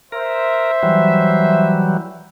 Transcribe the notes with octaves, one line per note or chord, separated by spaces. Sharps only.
A#4 C5 E5
E3 F#3 G3